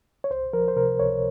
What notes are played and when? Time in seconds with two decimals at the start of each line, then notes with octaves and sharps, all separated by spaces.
0.24 C#5
0.30 C#2 C5
0.53 F3 A#4
0.68 C5
0.76 C3 A#4
0.99 C#2 C#5